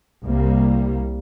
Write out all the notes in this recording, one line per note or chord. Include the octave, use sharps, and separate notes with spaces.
C2 G3 A#3